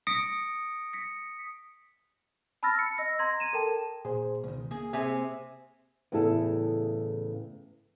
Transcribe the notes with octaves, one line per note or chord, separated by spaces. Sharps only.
D#6 A#6 B6 C#7 D7
A#6 B6 C#7
A5 B5 E6 F6 A6 A#6
C#7
D#5 E6 A#6
A#5 C6 G#6 A#6
G#6 D#7 E7
A4 A#4 G5 A5
A#2 G#4 C5
C#2 B2 D#3
A#3 G#4
C3 G#4 E5 G#5
E2 A2 C#3 E4 A4